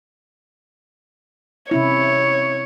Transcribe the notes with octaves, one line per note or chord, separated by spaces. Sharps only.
C3 C#4 E4 C#5